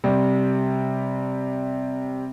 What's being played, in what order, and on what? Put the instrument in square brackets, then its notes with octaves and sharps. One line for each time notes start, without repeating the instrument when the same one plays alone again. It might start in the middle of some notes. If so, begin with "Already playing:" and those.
[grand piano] C3 G3